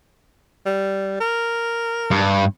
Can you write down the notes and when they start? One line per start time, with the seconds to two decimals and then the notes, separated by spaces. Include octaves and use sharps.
0.66 G3
1.20 A#4
2.11 G2